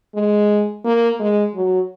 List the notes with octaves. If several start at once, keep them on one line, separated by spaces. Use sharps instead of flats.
G#3
A#3
G#3
F#3